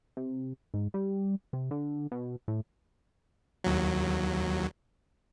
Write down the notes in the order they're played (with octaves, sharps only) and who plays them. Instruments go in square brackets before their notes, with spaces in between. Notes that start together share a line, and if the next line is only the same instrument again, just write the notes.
[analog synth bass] C3
G#2
G3
C3
D3
B2
A2
[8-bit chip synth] D#2 F#3